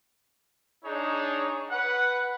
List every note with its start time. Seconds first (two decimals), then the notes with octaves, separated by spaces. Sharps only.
0.84 D4 D#4 G#4 C#5
1.70 B4 F#5